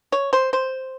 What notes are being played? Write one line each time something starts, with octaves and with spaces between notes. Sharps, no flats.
C#5
C5
C5